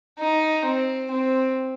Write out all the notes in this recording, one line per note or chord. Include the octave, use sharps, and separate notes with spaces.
D#4
C4
C4